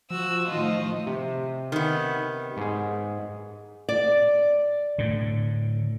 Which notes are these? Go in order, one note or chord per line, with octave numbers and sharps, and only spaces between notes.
F3 F#4 E6
A2 D#3 F4 D#5
C3
D#3 B3
G#2 G#4
D5
A2 D3